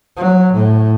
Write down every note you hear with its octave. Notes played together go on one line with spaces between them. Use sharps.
F#3
A2